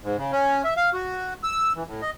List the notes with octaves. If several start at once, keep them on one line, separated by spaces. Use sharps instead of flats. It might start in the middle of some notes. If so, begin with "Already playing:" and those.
G#2
C#3
C#4
E5
F5
F#4
E6
E3
A2
D#5